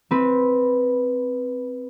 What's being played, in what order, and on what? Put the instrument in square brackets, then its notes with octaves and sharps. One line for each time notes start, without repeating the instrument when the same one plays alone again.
[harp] C4 B4